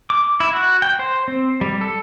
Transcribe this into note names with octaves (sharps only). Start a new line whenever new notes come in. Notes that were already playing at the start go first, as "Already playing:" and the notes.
D6
E4
F#4
G5
C5
C4
G3
A4